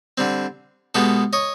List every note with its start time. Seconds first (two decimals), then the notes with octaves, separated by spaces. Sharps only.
0.18 D3 G3 C4
0.95 B2 G#3 B3 G4 A4
1.33 C#5 D#5